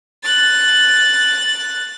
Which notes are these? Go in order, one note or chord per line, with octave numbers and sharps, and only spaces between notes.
F#6 A6